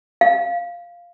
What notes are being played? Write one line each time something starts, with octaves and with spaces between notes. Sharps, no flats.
F5